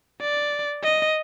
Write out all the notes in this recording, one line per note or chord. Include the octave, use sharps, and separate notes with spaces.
D5
D#5